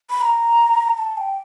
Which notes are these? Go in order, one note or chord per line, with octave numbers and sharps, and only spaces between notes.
B5
A#5
A5
G5